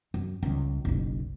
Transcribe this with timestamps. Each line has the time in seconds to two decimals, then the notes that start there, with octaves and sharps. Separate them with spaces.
0.14 F#2
0.43 C#2 G3
0.85 F#1 B1